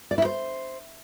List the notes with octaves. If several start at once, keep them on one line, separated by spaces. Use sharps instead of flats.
D5
E4
C5